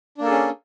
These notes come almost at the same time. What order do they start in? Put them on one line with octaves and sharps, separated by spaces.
D4 A#3 A4 G#4 C#4